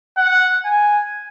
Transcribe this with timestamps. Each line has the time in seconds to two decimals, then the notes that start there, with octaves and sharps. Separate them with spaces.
0.17 F#5
0.65 G#5